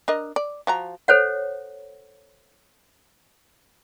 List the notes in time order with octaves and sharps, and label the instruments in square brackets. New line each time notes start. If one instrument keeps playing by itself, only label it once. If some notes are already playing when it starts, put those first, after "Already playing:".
[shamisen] D4 A#4 D#5
D5
F3 F#4 A#5
[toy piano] A4 C5 C#5 F#5